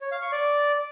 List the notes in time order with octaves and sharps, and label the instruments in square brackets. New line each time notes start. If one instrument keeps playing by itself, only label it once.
[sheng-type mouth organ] C#5
F5
C#6
D5